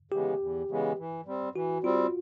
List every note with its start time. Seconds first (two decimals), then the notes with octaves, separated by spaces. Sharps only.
0.11 C#3 E3 G#3 B3 G4
0.39 E2
0.69 C#3 E3 G#3 B3
0.98 E3
1.26 G3 C4
1.55 E3 F#4
1.84 G3 C4 F4